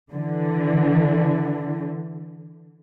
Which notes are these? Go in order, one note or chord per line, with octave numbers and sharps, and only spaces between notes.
D3 E3